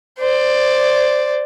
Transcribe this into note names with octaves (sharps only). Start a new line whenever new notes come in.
C5 D5